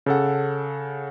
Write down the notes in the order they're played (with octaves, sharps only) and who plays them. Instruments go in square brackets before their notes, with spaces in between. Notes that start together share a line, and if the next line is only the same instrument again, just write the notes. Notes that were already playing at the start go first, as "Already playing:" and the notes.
[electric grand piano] C#3 A4 F#5